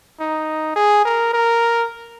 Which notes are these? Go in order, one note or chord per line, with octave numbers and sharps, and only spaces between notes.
D#4
G#4
A#4
A#4